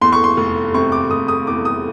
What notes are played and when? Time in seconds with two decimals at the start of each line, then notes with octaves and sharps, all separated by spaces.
0.01 E2 C6
0.13 C#6
0.24 C6
0.37 F1
0.74 C3 C#6
0.92 D6
1.11 F1 D#6
1.28 D#6
1.47 E2 D6
1.65 D#6